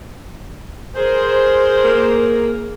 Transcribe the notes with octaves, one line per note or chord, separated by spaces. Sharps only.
G#4 A#4 C5
A#3